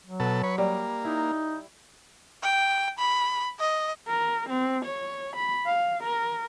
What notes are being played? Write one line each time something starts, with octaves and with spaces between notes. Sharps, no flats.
F#3
B2 A4
B4 C#5
G3 A#3
D#4 E4
G5
B5
D#5
A#4
C4
C#5
B5
F5
A#4